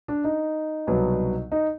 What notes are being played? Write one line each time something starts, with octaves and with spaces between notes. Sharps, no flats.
D4
D#4
C2 B2 F#3 B3
D#4